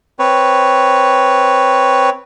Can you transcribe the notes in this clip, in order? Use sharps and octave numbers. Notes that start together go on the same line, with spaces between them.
C4 B4 C#5